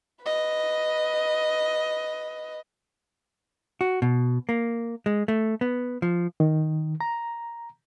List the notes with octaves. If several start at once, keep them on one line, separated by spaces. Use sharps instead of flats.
B4 D#5
F#4
B2
A#3
G#3
A3
B3
F3
D#3
A#5